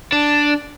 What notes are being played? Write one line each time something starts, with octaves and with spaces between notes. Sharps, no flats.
D4